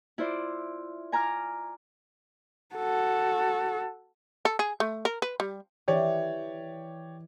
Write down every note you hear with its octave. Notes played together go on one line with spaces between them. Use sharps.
E4 F4 C5 D5
G#5 A#5 D6 F6
F#4 A4
A4
G#4
A3
A#4
B4
G3
E3 G4 C#5 D5